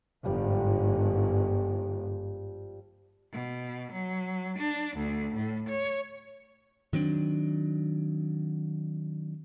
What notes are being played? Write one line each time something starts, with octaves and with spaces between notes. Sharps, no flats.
G1 G#2 F3 G3 D5
B2
F#3
D4
D2
A2
C#5
D#3 F#3 C4 D4